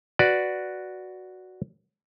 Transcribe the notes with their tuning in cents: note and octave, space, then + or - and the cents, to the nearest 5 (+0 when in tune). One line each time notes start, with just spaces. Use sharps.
F#4 +0 B4 +0 D5 +0